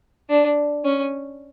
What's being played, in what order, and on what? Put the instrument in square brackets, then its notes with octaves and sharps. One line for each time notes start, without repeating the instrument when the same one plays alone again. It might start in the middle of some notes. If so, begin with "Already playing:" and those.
[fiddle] D4
C#4